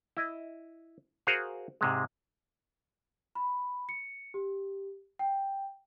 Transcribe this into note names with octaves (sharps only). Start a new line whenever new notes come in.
E4 D#5
F#4 G#4 A#4 C5 F5 F#5
G#2 C3 G#3
B5
C#7
G4
G5